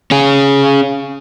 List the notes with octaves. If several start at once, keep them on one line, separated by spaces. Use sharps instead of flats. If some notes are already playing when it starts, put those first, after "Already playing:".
C#4 G#4